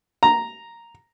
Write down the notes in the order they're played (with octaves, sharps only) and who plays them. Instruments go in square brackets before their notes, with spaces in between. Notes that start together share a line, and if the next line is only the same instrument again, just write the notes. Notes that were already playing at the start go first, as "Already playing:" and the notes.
[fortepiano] A#5